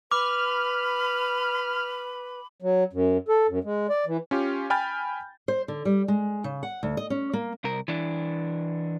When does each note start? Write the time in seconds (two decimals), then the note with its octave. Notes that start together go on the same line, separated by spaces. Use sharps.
0.11 B4 B5 D6 F6
2.62 F#3
2.93 F#2
3.28 A4
3.49 F#2
3.64 G#3
3.89 D5
4.07 E3
4.31 C#4 F4 G4
4.70 G5 G#5 B5 F6 G6 A6
5.48 C5
5.68 D3
5.85 G3
6.08 G#3
6.44 C#3
6.63 F#5
6.83 D2
6.97 D#5
7.10 C#4
7.33 A#3
7.64 C2 A#4
7.88 E3 D4